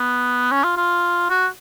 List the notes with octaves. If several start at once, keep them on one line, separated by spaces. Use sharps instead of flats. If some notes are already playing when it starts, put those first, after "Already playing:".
Already playing: B3
C#4
F4
F4
F#4